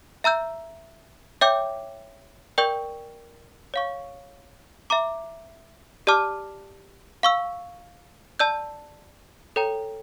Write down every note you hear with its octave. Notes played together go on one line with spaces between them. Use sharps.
E5 A#5 E6 G6
C#5 E5 G5 D6 G6
A#4 D5 G5 C#6 G6
C#5 F5 C#6
E5 A#5 D6
G4 D5 A5 D6 F6
F5 C#6 E6
D5 A5 E6 G6
A4 C#5 G5 A#5